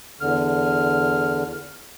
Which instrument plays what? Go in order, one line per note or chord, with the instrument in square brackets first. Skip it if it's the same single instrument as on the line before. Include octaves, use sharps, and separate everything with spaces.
[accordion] E2 D3 F6